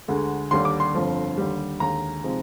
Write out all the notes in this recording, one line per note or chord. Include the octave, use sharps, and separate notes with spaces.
D2 D3 G#3
D#2 D3 G3 D4 C6
D6
C6
G1 F2 D3 F3
D#2 D3 G3
D#2 D3 G#3 A#5
C3 F3 G#3 D#4